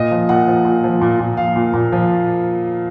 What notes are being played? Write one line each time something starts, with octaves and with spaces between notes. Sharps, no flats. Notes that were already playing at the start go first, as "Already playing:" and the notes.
Already playing: A#2 D#5
F3
A#2 F#5
F3
A#2
F3
A#2
A#2
F3 F5
A#2
A#2
F3